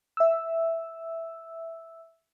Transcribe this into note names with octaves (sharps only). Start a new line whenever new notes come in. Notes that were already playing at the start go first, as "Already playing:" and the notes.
E5 E6